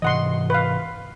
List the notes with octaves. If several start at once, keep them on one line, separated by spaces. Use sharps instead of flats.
G#2 C3 E3 D#5 F#5 C6
B4 F5